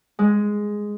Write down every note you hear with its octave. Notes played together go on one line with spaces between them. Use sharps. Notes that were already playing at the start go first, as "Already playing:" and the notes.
G#3